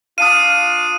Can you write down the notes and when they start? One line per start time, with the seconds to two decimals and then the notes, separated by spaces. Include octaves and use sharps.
0.18 D4 F4 F5 D#6 D#7